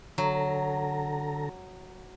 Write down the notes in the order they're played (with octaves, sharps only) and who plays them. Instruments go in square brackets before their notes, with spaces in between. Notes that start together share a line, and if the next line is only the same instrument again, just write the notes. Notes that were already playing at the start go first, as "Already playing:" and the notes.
[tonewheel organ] D3 A4 A#5 [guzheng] F#3